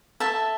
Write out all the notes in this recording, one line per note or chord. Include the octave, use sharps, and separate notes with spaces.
A4 E5 A5